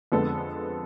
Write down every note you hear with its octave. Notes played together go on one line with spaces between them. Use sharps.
F2 D3 G#3 B3 A4